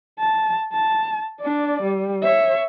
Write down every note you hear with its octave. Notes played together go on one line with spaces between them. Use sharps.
A5
A5
D4 D5
G3
C#5 E5